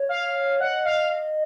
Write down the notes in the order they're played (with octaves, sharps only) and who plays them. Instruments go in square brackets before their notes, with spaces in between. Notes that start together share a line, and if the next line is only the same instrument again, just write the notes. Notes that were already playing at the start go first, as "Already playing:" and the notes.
Already playing: [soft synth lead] C#5
[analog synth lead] F5
[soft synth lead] D#5 [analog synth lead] F#5
[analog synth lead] F5